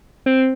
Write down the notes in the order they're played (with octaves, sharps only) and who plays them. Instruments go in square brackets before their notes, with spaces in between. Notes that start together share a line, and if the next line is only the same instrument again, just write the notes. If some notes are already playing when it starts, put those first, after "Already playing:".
[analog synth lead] C4